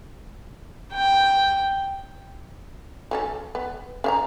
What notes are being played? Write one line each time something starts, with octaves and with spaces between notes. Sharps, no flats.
G5
F#3 C#4 A4
B3
C#4 F5 A#5